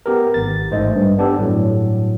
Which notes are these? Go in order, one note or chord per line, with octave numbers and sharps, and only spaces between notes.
B3 G4 A#4
G#1 A6
A1 G#2 A3 C5 D#5
G2
B3 D4 G4 A4
G1 A2 F#3